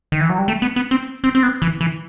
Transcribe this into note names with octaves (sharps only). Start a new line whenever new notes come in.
D#3
E3
F#3
G3
A3
B3
B3
C4
C4
C4
B3
E3
E3